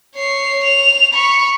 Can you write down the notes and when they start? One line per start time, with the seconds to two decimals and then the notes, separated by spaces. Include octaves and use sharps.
0.15 C#5 C7
0.64 F7
1.14 B5 C#6